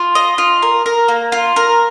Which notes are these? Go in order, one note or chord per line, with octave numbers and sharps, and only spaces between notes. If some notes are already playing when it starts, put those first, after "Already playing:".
Already playing: F4
D#5
F4
A#4
A#4
A#3
F4
A#4